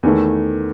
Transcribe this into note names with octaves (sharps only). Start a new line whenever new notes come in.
E2 D#3 A3